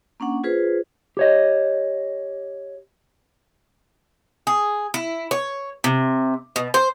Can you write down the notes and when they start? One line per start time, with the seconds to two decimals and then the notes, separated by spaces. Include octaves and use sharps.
0.20 A#3 C#4 D4 F#5
0.44 F4 G#4 B4 C5
1.17 G4 C#5 D#5
4.47 G#4
4.94 E4
5.31 C#5
5.84 C3
6.56 B2
6.74 C5